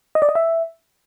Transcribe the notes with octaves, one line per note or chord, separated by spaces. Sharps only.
D#5
D5
D#5
E5